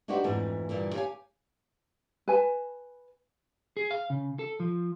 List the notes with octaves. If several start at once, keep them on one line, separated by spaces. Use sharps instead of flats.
D4 D#4 F#4 G4 B4 C5
F2 G#2 E3 A3
G2 A#2 D3 E3
G4 C#5 F5 G#5
B4 G#5 A5
G#4
F5
C#3
A4
F3